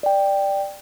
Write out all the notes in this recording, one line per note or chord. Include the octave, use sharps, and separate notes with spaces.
D5 G5